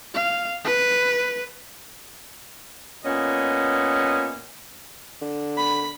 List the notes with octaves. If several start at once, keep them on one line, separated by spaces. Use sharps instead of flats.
F5
B4
A#2 B3 C#4 D#5
D3
B5